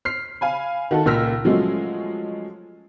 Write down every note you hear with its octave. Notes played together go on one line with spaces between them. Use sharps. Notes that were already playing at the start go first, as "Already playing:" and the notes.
F6 B6 C7
F5 G#5 B5
D#3 F#4 A4
C#2 A#2 E6 F6 A#6 B6
F3 F#3 G#3 A3 C#4